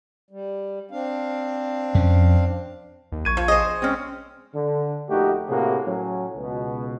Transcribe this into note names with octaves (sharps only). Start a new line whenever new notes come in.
G3
C4 D4 F5
F2 C#4
D#2
A#1 C#6 G#6 D#7
F3
G#4 C5 D#5
G#3 C4 C#4
D3
A#1 A3 D#4 F#4 G4
A2 C3 A#3 F#4 G#4
A2 F#3 C#4
C#2 B2